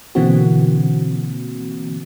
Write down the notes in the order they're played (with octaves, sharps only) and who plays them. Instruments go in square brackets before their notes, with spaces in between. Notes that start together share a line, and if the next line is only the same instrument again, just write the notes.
[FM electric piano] B2 D3 E3 A#3 C4 F#4